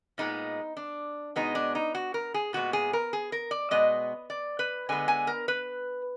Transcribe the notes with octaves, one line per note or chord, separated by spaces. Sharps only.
A#2 G#3 B3 D#4
D4
B2 G#3 B3 D#4
D4
D#4
F#4
A#4
G#4
A#2 G#3 B3 F#4
G#4
A#4
G#4
A#4
D5
B2 G#3 B3 D#5
D5
B4
D3 G#3 B3 G#5
G#5
A#4
B4